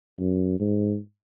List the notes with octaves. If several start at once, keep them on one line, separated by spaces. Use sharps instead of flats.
F#2
G#2